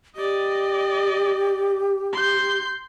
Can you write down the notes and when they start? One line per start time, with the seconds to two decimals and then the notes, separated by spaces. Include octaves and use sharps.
0.16 G4 D5 D#5
2.13 C6 G6